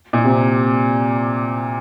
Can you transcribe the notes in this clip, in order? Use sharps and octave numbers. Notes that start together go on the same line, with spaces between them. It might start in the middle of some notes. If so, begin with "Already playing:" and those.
A#2
C3